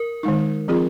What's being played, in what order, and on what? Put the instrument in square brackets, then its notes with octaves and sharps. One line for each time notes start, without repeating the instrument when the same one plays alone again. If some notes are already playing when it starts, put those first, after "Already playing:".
Already playing: [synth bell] A#4
[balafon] D#3 G#3 D#4
F3 C4 F4 G#4